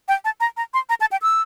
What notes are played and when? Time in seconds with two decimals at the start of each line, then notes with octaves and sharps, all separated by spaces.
0.08 G5
0.25 A5
0.40 A#5
0.57 A#5
0.74 C6
0.89 A#5
1.01 A5
1.12 G5
1.22 E6